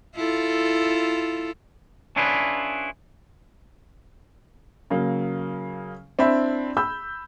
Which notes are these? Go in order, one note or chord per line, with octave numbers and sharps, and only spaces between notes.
E4 F4 A4
C#4 D4 E4 F4 G#4 B4
C#3 F#3 A#3
C4 D4 E4 E5 B5
B5 E6 G6